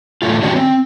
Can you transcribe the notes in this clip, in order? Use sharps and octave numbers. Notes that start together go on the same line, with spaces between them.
A2 D3 A3 F4
D#3 G3 C#4 D4 F#4
C4